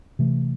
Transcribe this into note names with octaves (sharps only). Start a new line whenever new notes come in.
C3 E3 A3